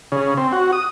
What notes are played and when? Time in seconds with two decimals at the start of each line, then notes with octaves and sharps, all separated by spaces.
0.12 C#3
0.37 C4
0.53 F#4
0.72 D#6